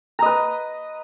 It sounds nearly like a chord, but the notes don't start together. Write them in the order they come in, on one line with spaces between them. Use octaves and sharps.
A#5 D#5 B4